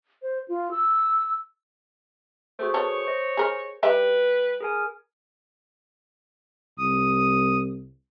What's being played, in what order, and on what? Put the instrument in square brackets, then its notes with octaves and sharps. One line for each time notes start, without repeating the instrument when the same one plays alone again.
[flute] C5
F4
E6
[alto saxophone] A3 [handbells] F#4 G#4 C5
[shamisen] B3 A4 [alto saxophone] C#5
[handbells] C5 D#5
[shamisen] G#4 A#4
[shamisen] G3 G4 E5 [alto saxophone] B4 [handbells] G5
[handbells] G#4 A#4 G#5
[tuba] C2 [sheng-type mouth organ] D#6